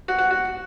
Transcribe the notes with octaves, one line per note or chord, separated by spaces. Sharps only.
F#4
F#4
F#4